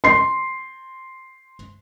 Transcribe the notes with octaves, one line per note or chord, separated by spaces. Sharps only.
C6 C7